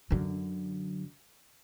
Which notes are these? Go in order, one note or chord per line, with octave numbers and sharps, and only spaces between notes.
F#2 D3